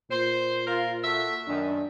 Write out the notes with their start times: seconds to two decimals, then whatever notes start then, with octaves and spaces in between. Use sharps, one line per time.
0.11 A#2 C5
0.67 F4 A#4
1.04 F#4 A4 E5
1.48 F#2 D#3 D4